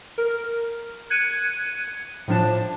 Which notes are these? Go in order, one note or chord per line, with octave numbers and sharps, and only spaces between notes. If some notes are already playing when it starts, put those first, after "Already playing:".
A#4
F#6 G#6 C#7 D#7
A2 F3 D4 A5